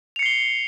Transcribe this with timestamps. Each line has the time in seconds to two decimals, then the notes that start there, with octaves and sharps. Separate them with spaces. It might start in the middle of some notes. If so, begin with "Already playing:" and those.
0.16 F7
0.19 C#7
0.22 C7
0.26 G7